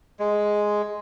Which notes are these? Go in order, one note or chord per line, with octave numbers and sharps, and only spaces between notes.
G#3